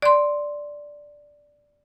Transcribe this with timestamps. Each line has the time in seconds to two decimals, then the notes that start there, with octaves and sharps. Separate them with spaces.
0.02 D5 C6